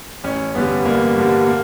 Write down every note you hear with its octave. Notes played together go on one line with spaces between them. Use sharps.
A1 C#4
G2 D3 G3 B3
A1 A#3
G2 D3 G3
A#3